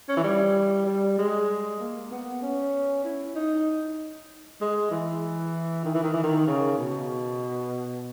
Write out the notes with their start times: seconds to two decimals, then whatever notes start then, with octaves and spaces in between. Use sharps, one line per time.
0.09 C#4
0.17 E3
0.24 G3
0.86 G3
1.18 G#3
1.80 A#3
2.11 B3
2.42 C#4
3.05 E4
3.36 D#4
4.61 G#3
4.91 E3
5.85 D#3
5.94 E3
6.04 D#3
6.14 E3
6.23 D#3
6.47 C#3
6.78 B2